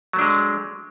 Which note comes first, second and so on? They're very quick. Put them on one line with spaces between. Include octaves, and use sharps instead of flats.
F#3 A3 D4 G#3